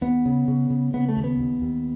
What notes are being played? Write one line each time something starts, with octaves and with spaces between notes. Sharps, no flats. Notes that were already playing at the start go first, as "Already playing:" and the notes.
D#2 B3
C#3
C#3
C#3
C#3 B3
A3
D#2
B3
D#2
D#2